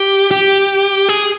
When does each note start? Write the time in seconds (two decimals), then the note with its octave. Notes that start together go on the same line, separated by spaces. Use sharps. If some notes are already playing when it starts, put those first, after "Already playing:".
Already playing: G4
0.31 G4
1.09 G#4